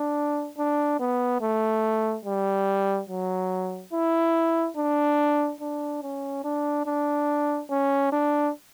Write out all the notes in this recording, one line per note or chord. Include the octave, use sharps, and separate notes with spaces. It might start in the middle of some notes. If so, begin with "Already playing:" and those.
Already playing: D4
D4
B3
A3
G3
F#3
E4
D4
D4
C#4
D4
D4
C#4
D4